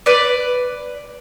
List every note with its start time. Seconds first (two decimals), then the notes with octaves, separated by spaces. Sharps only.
0.06 B4 D5